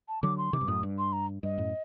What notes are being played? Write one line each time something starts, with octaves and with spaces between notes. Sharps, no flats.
A5
D3 F#3 D6
C6
C3 D#3 D6
G2
F#2 A2 D#6
G2
C6
A#5
G2 D#5
F#2 A2